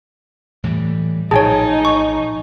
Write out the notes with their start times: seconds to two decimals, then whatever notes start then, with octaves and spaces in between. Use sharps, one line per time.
0.64 A2 E3 G3
1.31 A#1 A2 D#4 G#4 C#5 G#5 A5
1.85 C#6